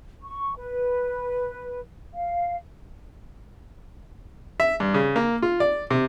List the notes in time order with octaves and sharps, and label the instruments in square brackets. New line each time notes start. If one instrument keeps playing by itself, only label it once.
[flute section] C#6
B4
F5
[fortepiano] E5
G2
C#3
A#3
F4
D5
C3